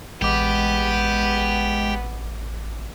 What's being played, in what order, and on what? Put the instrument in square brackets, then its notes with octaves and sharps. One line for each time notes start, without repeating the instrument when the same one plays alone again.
[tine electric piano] A1 D6 [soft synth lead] G#3 [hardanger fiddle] B3 [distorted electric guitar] G4